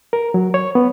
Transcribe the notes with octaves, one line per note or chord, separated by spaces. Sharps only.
A#4
F#3
C#5
B3